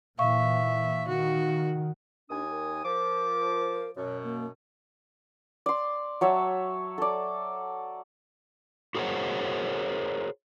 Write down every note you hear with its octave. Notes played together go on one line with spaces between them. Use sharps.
A#2 E3 E5 F5 C#6
D#3 F#4
D#2 D4 G#5 D#6
A#4
F3 A#4 D6
F#2 B2 C#5
A#3
D5 C6
F#3 C#5 E5 A5
A4 D5
F#4 G#4 A#4 C5 C#5 F#5